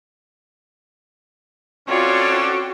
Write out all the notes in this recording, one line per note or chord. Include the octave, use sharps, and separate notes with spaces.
C4 C#4 F4 F#4 A4 C#5 D5 G5